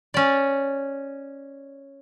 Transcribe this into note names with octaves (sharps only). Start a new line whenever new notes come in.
C#4 D5